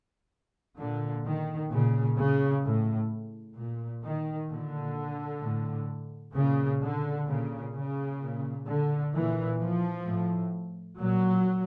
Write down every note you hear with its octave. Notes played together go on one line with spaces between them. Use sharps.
A#2 D3
D#3
A#2 C#3
C#3
A2
A#2
D#3
A#2 D3
A2
A#2 C#3
D3
A#2 C#3
C#3
A#2
D3
A#2 E3
F3
A2
A#2 F#3